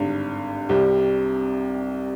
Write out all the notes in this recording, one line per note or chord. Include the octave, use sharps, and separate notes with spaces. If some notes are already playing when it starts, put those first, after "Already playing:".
Already playing: G#1 G2 D3
C2 C3 G3